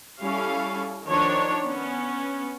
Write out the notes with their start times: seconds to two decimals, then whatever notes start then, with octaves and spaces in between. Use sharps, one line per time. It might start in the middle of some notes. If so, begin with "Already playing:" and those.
0.21 G3 C#4 E4 A4 F5
1.07 D#3 F3 D4 C#5
1.64 B3 C#4